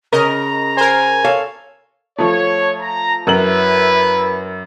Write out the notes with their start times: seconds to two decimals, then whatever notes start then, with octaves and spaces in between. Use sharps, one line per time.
0.13 C#3 A#4 D#5 A#5
0.77 A#4 C5 G#5
1.24 A4 C#5 F5
2.18 F3 A3 C#5
2.80 A#5
3.27 F#2 E4 A#4 B4 F#7